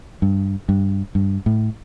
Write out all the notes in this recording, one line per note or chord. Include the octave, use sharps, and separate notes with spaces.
G2
G2
G2
A2